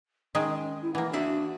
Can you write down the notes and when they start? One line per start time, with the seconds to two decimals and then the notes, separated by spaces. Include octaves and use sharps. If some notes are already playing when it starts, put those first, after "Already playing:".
0.35 D#3 G#3 C#4 G#4
0.82 E4
0.95 E3 A#3 F#5
1.13 D4 F#4 E5